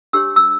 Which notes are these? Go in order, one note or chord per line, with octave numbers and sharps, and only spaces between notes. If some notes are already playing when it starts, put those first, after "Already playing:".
D4 G4 C#5 E6
E6